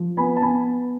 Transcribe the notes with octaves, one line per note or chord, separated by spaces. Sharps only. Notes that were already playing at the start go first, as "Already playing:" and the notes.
Already playing: F3
B3 G#5 B5
A5
B3 G#5 B5